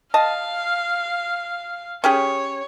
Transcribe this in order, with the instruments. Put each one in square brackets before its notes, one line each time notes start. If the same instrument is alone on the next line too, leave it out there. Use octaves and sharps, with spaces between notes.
[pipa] D#5 A5 [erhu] F5
[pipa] C#4 G4 G#4 [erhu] C#5